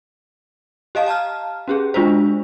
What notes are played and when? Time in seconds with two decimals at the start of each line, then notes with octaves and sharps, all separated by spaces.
0.95 G4 D#5 F5 A5
1.06 F5 A5 A#5 F6
1.68 C#4 G4 G#4
1.94 G#3 D4 F4 F#4 C5